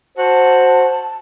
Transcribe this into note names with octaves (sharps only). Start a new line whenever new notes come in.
F#4 C5 A5